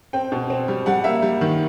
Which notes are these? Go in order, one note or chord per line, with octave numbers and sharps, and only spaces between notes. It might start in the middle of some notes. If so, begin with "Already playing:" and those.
C4 G5
B2
C4
G3
G3 F#5
A#3 E5
G3
D#3